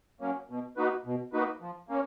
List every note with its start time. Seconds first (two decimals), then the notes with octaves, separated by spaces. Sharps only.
0.21 F#3 A#3 C#4
0.50 B2
0.77 A#3 D#4 F#4 B4
1.06 B2
1.33 A#3 D#4 F#4 B4
1.61 F3
1.89 A#3 C#4